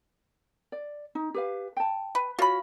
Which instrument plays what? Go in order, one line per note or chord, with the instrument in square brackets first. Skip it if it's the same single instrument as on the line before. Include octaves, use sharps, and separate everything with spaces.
[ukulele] D5
D#4
G4 B4 F5
G5 A5
[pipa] B4
[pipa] F4 B5 [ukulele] F#4 C#5